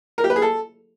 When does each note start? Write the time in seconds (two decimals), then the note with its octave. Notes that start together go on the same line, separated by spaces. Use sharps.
0.18 A#4
0.24 G4
0.30 B4
0.36 G#4
0.42 A4